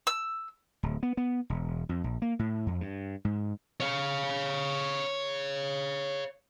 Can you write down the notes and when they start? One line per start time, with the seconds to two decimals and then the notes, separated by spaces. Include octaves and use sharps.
0.07 E6
0.83 D1
1.03 B3
1.17 B3
1.50 E1
1.89 F2
2.04 A#1
2.22 A#3
2.39 A2
2.66 F2
2.81 G2
3.25 G#2
3.80 C#5 F5